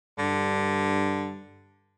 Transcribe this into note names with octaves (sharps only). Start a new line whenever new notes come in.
G2 D3